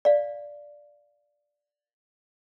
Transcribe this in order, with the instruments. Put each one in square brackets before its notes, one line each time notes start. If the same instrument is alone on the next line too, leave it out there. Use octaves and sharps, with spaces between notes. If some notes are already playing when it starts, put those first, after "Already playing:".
[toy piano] D5 F5